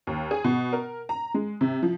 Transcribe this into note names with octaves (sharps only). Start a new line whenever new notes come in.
D#2
G#4
B2
A#4
A#5
G#3
C3
F3